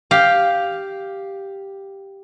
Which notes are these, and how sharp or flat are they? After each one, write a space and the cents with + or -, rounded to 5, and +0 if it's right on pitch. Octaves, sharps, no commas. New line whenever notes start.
G4 +0 F5 +0